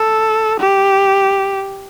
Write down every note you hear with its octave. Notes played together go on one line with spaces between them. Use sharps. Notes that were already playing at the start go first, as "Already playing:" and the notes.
Already playing: A4
G4